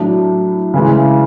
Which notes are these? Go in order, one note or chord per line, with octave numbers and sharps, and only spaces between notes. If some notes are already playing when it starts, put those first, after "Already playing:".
Already playing: A2 F#3 A3 D4
C#3 E3 G#3